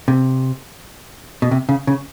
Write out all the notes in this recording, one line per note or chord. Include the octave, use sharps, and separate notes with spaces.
C3
B2
C3
C#3
C#3